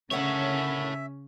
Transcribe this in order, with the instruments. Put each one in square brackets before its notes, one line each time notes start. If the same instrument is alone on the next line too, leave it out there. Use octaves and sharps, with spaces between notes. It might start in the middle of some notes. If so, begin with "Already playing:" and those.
[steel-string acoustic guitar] D2 A#4 F#5 [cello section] C#3 C#4 [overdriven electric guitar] A4 C#5 [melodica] E5